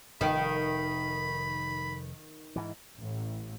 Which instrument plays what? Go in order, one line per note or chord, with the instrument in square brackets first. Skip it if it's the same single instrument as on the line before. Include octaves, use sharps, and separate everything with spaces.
[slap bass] F1 [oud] D#3 [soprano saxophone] B5
[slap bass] G#2 E3
[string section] A1